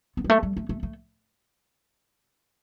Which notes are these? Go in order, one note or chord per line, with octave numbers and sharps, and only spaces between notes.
B3
G3
A3
G3
A3
A3
A3